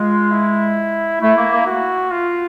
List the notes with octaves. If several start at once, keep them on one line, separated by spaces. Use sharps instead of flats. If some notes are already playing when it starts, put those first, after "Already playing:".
Already playing: G#3 F4
E4
A3 E4
A#3
A#3
F#4
F4